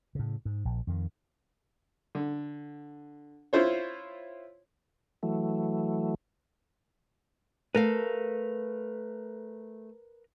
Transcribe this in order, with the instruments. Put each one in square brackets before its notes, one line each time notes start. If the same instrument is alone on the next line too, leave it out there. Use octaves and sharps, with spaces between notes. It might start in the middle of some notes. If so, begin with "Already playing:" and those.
[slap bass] A2 C#3
G#2
A#1
F2 D#3
[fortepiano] D3
E4 F4 C5 C#5
[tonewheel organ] E3 F#3 A3
[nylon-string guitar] A3 F5 [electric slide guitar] A#4 B4